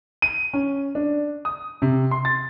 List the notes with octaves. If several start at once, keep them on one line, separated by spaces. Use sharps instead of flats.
D#7
C#4
D4
D#6
C3
C6
A6